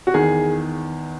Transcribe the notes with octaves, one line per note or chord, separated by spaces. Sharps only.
F#4
E2 D#3 G#4